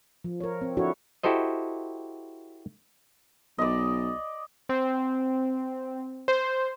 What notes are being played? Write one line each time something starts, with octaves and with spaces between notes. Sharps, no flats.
F3
A#4 C#5
C4
F3 D4 E4 F#4 A4 C#5
E4 F#4 G4 A4 C5 D#5
B1 D5 D#5
C4
C5